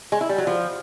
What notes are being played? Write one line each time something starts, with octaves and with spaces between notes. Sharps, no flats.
G#3
E4
G3
F#3
F3